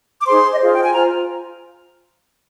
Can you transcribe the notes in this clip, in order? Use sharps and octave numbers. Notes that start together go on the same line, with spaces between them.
D6
D#4 G#4 C5 C6
D#5
F4 G#4 C5 F5
G5
G#5
F4 C5 A#5